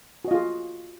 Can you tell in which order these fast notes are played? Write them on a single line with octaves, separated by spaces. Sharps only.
F#4 D#5 F4 G#4